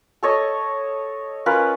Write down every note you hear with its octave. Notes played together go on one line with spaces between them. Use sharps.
A4 C#5 D#5
C#4 F4 A#4 B4